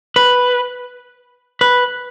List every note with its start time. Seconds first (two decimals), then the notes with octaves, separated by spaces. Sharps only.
0.16 B4
1.61 B4